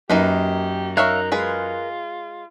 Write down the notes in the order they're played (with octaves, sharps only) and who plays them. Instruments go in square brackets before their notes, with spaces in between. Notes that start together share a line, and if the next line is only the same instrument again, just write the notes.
[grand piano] F#2 [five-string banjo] A#3 D#4 B4 [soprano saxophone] G4
[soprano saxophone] D#4 [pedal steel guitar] A#4 F#6 [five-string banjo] C#5 E5 F5
[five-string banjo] G#3 G#4 B4 [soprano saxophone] F4